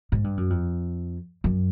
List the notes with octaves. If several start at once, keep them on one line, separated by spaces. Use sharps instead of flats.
G#2
G2
F#2
F2
F#2